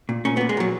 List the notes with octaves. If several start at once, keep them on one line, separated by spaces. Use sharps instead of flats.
A#2
A#2 C#4
B3
A#2
G#3
A#2 F#3